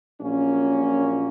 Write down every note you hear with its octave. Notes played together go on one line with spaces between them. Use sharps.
A#1 A#2 F#3 A#3 C#4